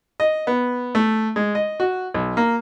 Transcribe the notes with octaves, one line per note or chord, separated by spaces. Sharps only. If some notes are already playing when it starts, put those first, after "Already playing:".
D#5
B3
A3
G#3
D#5
F#4
B1
A#3